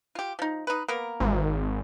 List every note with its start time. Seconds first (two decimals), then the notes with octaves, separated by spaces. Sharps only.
0.15 F4 G4
0.39 F3 D#4
0.67 D#4 B4
0.88 A#3 B3 A#4
1.20 G#1